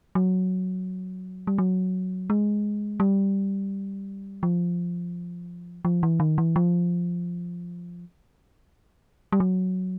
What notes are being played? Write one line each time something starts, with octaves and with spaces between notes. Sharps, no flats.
F#3
G3
F#3
G#3
G3
F3
F3
E3
D#3
E3
F3
G3
F#3